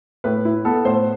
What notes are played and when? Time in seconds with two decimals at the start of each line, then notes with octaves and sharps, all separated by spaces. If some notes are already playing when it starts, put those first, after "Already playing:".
0.24 A2 B4
0.45 E4
0.65 B3 A4
0.85 A2 C5